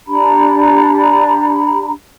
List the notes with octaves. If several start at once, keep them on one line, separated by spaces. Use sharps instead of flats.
D4 G4 A#5 B5